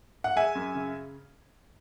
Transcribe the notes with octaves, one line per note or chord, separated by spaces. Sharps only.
F#5
G#3 E5 G#5
F#2
C#3